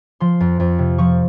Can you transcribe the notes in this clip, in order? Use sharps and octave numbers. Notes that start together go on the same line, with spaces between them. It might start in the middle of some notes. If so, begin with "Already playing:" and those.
F3 C6
F2
F2
C3
F3 C#6